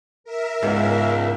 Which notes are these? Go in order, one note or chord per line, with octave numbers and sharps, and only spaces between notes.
A#4 E5
C#2 G#2 B3